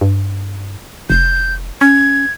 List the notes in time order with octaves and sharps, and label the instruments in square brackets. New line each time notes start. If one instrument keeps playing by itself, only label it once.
[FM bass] G2
[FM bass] F1 [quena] G6
[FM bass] C#4 [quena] G#6